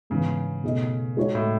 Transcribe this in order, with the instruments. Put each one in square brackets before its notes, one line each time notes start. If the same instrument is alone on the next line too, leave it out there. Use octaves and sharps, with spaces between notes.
[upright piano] G#2 E3 B3 [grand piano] C#3
[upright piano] B2 A3 D#4 G#4 D#5
G#3 D#4 F#4 C#5
[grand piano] A2